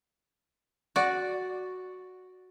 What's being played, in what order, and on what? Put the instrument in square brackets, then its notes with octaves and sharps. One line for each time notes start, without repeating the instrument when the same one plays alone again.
[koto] F#4 D5